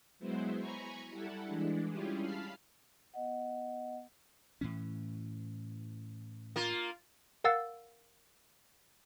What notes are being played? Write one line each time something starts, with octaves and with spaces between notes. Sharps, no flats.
F#3 G#3 B3 E4 C5
G#5 A#5 B5 C#6 G#6
G3 E4 A4 F#5
E3 G#3 D4
G3 C#4 E4 F4 G4 G#4
F5 A5 B5 F6 C7
B3 D#5 F#5
A2 E3 C#4
A#3 F4
A#4 F5 F#5 E6 A6